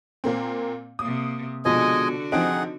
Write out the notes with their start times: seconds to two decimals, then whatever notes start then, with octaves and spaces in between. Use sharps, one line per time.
0.24 A#2 A#3 C4
0.99 C3 A#3 D#6
1.65 B2 D3 F3 G#3 F#4 D#5 G#5
2.32 F3 C4 D#4 G#4 F#5 D7